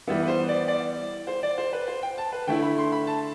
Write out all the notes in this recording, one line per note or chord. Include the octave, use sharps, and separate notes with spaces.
E3 G3 B3 E5
B4
C5
D5
D5
C5
D5
C5
B4
C5
G5
A5
B4
D3 A3 E4 G5
B5
C6
B5
A5